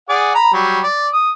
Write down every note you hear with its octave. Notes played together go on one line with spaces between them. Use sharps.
G#4 D5 F#5
A#5 B5
F#3 G3
D5
D#6